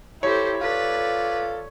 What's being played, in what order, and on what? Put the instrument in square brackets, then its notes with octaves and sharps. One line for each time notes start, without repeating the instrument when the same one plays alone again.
[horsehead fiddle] E4 A4 [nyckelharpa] G4 C5 [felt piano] C#5
[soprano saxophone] F4 [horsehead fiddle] A4 [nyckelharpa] B4 D5